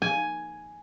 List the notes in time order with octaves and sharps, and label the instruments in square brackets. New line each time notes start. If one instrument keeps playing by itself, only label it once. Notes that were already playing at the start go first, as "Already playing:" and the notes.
[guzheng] G#5